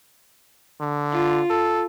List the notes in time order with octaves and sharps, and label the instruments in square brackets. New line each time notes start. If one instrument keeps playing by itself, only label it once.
[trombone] D3
[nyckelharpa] F4
[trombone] A4